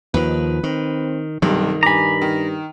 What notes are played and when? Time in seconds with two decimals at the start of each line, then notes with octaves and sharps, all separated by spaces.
0.14 D#2 D#3 F3 B4
0.63 D#3 C4
1.42 B1 G2 C3 D#3
1.83 G2 G#5 A#5 B5 D6
2.22 D#3